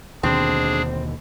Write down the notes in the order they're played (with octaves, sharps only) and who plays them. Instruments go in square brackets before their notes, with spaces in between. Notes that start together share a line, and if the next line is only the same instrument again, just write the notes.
[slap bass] D#2 B2 D3 [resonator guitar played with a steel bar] C4 [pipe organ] D4 G#4